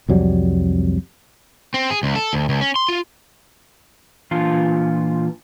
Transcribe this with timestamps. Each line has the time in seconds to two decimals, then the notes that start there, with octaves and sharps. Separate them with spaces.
0.09 C2 F2 F#3 G3
1.74 C4
1.90 G#4
2.03 C#2
2.15 A4
2.33 D2
2.49 C#2
2.61 C#4
2.76 C6
2.89 F4
4.31 A#2 E3 D4 F4 F5